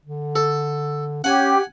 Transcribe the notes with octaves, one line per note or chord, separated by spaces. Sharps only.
D3
A4
C#4 G4 C#5 F#5 G#5